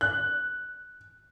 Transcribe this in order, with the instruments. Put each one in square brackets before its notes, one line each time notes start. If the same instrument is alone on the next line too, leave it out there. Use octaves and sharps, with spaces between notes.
[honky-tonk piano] F#6